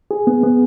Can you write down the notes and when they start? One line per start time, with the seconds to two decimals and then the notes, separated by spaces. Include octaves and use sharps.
0.11 G#4
0.27 B3
0.43 B3